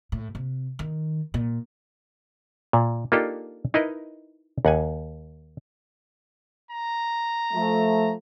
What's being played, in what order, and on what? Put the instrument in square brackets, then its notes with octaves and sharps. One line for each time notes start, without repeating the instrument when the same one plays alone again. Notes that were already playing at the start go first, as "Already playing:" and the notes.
[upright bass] A2
C3
D#3
A#2
[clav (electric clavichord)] A#2
A#3 D4 D#4 F4 G4 A4
D#4 E4 A#4 B4 D#5
D#2 F#5 G#5
[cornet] A#5
[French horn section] F3 A3